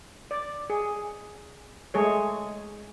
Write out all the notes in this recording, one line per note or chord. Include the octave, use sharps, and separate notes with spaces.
D5
G#4
G#3 A3 G#4 C#5